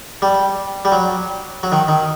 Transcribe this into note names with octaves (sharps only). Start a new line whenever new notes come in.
G3
G3
F#3
F#3
D#3
D#3